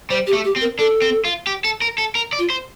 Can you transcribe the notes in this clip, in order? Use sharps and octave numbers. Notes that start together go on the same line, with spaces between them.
G3 C5
G4
A3
G4
C4
A#4
D4 A4
C4
F4
G4
A4
A#4
A4
A#4
D5
F4
C5